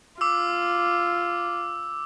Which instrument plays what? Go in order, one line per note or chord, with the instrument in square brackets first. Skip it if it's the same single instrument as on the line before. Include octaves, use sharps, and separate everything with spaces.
[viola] F4 [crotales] D6 E6